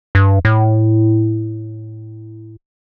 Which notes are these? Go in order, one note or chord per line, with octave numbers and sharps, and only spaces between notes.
G2
A2